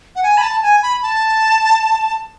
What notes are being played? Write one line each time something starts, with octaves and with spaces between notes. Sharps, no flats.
F#5
G#5
B5
A5
G#5
B5
A5